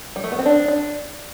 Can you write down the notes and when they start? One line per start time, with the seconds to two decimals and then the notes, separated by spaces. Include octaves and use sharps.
0.16 G3
0.24 A3
0.32 B3
0.39 C4
0.46 D4
0.68 D4